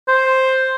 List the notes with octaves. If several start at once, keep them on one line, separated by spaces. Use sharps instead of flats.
C5